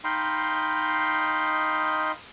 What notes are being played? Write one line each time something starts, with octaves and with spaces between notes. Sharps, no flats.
D#4 D#5 F5 G5 B5 C6